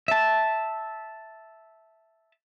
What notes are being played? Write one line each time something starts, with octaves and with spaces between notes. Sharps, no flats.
E5 A5